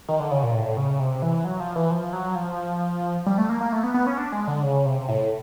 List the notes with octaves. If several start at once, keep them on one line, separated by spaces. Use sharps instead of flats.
D#3
D3
C#3
A#2
A2
C#3
C3
E3
F#3
F3
E3
F3
F#3
F3
G3
A3
A#3
A#3
A3
B3
B3
C#4
D4
G#3
D3
C#3
C3
A2